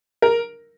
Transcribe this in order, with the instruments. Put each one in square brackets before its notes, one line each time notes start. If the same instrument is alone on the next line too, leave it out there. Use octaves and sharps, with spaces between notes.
[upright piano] A#4